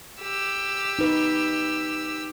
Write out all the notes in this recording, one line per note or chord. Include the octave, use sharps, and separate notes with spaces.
G4 E6
D#4 B4